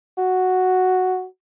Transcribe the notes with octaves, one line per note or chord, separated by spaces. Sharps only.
F#4